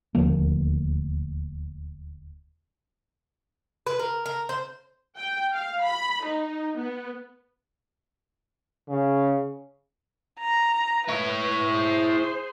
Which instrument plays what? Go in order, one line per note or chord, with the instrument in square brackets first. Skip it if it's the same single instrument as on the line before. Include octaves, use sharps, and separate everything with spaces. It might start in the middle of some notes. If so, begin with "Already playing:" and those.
[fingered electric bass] D#1 D2 F3 A#3
[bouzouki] B4
A#4
A#4
C5
[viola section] G5
F5
B5
D#4
B3
[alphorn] C#3
[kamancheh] A#5
[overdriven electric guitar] E4 C#5 [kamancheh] B4
[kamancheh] G#4 C5